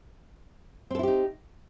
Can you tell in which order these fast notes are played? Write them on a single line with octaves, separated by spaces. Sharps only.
C4 A4 E4 G4 D#4